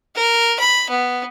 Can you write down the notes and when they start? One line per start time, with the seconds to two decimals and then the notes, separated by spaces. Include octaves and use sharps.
0.16 A#4
0.59 B5
0.90 B3